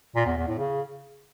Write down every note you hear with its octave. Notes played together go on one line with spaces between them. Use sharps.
A#2
E2
E2
A2
C#3